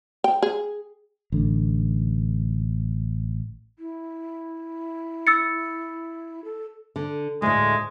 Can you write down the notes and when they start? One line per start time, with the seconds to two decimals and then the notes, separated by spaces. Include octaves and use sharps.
0.24 G5
0.42 G#4
1.32 A1 D3
3.79 E4
5.27 E6 A6 C#7
6.44 A4
6.96 D3
7.42 D2 A2 G#3